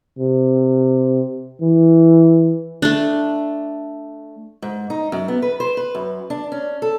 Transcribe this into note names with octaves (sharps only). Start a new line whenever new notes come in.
C3
E3
A3 D4
G#2
D#4
F#2
B3
B4
C5
B4
F#2
D4
C#4
A4